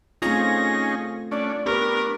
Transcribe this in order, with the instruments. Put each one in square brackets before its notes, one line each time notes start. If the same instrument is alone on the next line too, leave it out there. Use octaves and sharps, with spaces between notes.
[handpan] A3 C4 F4 [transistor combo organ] C#4 D#4 G#4 [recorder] A#6
[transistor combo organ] A3 C#4 D4 [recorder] D5
[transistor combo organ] B3 D4 [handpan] G4 B4 [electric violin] A#4 [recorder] C#6